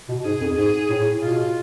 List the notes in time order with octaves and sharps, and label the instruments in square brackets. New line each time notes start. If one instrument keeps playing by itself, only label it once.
[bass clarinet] B2
[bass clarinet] G#2 [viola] G#4
[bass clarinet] F2
[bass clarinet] G#2 [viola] G#4
[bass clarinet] A2
[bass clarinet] B2 [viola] F4